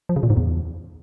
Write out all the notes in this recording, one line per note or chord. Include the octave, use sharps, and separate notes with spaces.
F3
C#3
A#2
G#2
E2